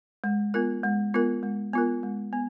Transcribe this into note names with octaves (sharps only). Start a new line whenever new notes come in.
G#3
B3 F4 A#4
G#3
B3 F4 A#4
G#3
B3 F4 A#4
G#3
B3